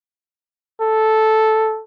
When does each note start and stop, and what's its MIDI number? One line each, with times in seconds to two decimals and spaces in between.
0.81 1.82 69